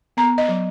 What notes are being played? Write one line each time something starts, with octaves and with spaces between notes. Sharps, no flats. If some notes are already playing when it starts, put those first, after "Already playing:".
B3 A#5
D#5
F#3